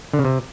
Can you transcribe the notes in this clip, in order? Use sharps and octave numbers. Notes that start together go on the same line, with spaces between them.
D3
C#3
C3